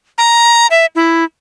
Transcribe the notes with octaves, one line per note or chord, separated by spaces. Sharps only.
A#5
E5
E4